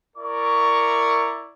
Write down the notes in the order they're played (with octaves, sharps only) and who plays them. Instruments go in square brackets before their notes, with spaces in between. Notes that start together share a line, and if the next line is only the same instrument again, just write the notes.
[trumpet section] E4 A#4 D5 C#6